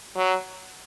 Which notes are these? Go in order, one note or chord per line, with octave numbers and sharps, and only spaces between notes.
F#3